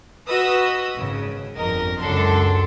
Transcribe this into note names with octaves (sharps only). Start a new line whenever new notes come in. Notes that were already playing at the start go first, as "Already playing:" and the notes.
F#4 B4 D#5 D#6 E6
G#1 C#3
G1 F2 A#4 D#5
C#2 F#2 D4 A4 C6